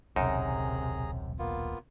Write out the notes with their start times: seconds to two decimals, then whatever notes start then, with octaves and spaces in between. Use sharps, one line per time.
0.16 D#1 B1 F#2 C3 D#4 G#4 A#5
1.39 A#3 B3 F4